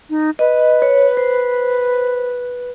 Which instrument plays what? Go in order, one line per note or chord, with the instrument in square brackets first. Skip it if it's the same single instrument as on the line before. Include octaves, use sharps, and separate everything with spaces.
[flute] D#4
[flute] B4 [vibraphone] D#5
[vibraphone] C#5
C5